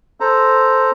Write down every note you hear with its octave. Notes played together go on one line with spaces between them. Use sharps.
A4 C5 A#5